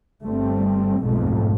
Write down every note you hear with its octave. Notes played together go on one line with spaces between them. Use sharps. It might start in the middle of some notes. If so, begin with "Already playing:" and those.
G1 G2 G3 A3 C4
B1 F2 G#2 B2 A3